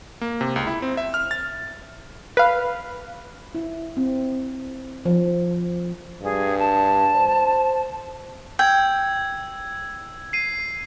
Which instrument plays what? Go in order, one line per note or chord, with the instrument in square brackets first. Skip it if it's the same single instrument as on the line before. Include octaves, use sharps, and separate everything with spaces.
[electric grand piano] A#3
C3
C#2
E4
C4
E5
F6
A6
[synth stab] B4 F5
[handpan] E4
C4
F3
[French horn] G2 [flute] G#4
[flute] A5
[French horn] C5
[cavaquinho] G5 [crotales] E6 G#6
[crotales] C7 D#7